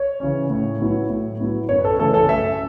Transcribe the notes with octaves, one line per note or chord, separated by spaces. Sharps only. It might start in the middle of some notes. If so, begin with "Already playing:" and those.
Already playing: C#5
C#3 E3 C#4
A2
F#3 B3 E4
A2
F#3 B3 E4
F#2 C#5
B4
A4
C#3 E3 A3 A4
A4
F#2 E5